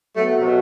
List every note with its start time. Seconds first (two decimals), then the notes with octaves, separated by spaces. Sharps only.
0.15 F#3 A3 B3 F#4
0.39 C3
0.45 B2